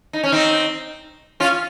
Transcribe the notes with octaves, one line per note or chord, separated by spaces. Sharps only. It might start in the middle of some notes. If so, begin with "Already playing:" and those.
D#4
C#4
C4 D#4
C#4 F4